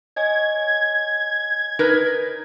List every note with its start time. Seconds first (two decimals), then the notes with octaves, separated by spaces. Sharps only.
0.16 C#5 D#5 G#5 G#6
1.79 D#4 A#4 B4